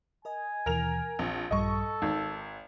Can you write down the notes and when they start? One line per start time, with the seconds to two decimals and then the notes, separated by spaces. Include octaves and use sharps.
0.25 A#4 D#5 G#5
0.66 D#2 B2 E3 A#4 F7
1.19 A#1 C4
1.51 A#1 G2 G3 A4 D#5 C#6
2.02 G#1 D#4